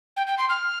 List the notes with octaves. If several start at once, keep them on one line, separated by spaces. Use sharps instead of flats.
G5
G5
C6
F6